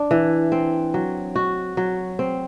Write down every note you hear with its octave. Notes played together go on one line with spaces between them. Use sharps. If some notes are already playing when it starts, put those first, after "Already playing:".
Already playing: D4
E3
C4
F#3
F#4
F#3
C4